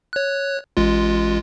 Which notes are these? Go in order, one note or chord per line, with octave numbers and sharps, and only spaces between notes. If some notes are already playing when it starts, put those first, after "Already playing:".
C#5 F#6
A1 G#3 F4